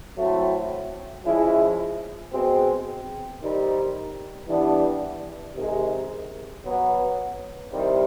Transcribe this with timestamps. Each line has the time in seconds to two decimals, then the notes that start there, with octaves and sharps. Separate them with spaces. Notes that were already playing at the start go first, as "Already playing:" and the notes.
0.17 F#3 A3 C4 E4
1.25 F3 G#3 C#4 E4
2.32 B2 G#3 C4
3.41 D#3 G3 C4 D#4
4.48 E3 G3 B3 D4
5.56 C3 D#3 G#3
6.64 B2 F#3 B3
7.72 C3 D#3 G3 C4 E4